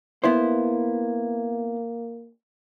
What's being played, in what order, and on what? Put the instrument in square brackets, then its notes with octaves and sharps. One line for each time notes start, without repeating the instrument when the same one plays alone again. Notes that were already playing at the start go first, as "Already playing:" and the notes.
[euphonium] A#3 [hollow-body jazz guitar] B3 E4 C5